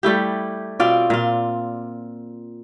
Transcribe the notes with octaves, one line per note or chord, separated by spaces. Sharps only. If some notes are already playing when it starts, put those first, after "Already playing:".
G3 A3 E4 G4
B2 C4 F4 D5
A#2 F4